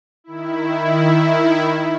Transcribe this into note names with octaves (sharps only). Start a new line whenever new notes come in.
D#3 E4